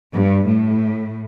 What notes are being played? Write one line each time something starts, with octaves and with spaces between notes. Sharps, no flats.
G2
A2